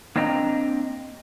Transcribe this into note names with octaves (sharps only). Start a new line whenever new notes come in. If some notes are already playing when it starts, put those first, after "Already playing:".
A#3 C4 D4 D#5 G5 A#5